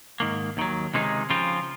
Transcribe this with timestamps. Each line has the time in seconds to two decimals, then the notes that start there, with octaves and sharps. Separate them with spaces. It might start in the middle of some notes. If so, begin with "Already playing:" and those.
0.20 G#2 D#3 A#3
0.57 D#2 D#3 F#3
0.94 C#2 C3 D#3 G#3 D#4
1.30 C#3 F3 C4 F4